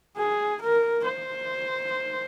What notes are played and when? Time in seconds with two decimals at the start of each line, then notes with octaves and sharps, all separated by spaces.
0.17 G#4
0.61 A#4
1.05 C5